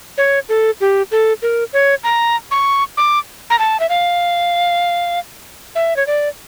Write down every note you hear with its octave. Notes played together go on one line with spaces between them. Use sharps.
C#5
A4
G4
A4
A#4
C#5
A#5
C#6
D6
A#5
A5
E5
F5
E5
C#5
D5